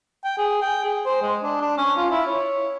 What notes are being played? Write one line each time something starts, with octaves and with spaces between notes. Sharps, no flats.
G5
G#4
G5
G#4
C5
G#3
D4
D4
C#4
F4
E4
C#5